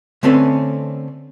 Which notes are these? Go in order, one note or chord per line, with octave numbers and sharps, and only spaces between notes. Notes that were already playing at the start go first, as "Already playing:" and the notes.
D3 A3 C4 C#4 A4 B4